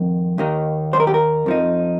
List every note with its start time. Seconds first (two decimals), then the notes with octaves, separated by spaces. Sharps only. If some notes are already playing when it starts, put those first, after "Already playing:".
Already playing: F2 D#3
0.38 D#2 D#3 A#3 D#4
0.93 C5
1.00 A#4
1.07 G4
1.14 A#4
1.46 F2 F3 D#4